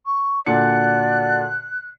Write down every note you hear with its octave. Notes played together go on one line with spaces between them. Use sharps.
C#6
A#2 D3 F#4 D5 F#5 A5 F#6 C#7